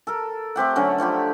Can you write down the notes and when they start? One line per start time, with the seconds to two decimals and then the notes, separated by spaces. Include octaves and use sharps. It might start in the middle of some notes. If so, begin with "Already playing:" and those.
0.07 A4 A#4
0.56 A3 C4 G4 F#5
0.76 D3 F#3 C#4
0.98 D3 F3 G4 B5